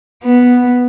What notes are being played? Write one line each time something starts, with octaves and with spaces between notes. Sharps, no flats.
B3